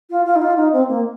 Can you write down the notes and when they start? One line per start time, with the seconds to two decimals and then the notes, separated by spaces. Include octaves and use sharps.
0.10 F4
0.25 F4
0.35 D#4
0.41 F4
0.56 D#4
0.72 C4
0.87 A#3